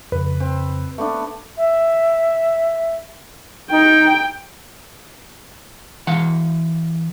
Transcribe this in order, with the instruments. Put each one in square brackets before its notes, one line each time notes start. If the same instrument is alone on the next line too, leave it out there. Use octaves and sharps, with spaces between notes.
[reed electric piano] F2 C#3 [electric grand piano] B4
[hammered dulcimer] C4
A3 B3 D4
[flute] E5
[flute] D#4 [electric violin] G5
[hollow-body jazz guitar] E3 F5 F#5